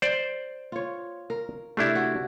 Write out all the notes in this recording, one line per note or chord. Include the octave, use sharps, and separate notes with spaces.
C5 D5
F4 C#5
A#4
C3 A3 D4 E4
F#4